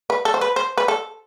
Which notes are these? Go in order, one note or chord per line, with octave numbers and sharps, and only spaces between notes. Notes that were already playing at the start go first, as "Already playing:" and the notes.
B4
A4
C5
B4
C5
B4
A4